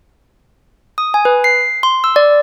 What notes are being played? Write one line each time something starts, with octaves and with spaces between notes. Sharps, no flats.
D#6
G#5
B4
C7
C6
E6
D5